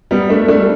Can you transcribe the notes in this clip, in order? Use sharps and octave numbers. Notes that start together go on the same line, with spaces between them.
G3 B3
A3 D4
A3 D4
G3